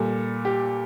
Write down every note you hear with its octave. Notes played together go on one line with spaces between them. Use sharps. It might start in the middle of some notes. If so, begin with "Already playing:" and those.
Already playing: A#2 G3 A4
G4